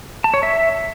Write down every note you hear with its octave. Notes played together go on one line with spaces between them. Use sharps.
A5
C#5
E5